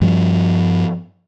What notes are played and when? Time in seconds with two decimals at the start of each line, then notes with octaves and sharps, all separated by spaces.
0.01 G2 F3 G3